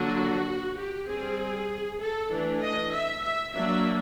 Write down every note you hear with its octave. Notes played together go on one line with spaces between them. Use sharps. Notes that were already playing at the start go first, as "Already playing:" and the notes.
Already playing: D3 F#3 A#3 D4 F#4
G4
G3 C4 G#4
A4
E3 A3 D4
D#5
E5
E5
F#3 A#3 D4 E5